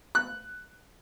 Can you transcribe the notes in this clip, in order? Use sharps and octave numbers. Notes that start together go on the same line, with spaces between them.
F#6